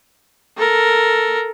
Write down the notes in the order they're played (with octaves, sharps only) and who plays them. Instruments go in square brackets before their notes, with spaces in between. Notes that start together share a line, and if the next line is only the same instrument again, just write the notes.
[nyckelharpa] A4 A#4